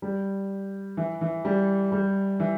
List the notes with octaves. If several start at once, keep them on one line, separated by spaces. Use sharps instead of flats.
G3
E3
E3
G3
G3
E3